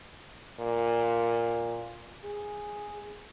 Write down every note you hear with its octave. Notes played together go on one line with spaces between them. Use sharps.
A#2
G#4